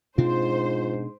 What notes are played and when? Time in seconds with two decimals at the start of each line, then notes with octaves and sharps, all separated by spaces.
0.18 G#2 B2 C4 D4 F4 C5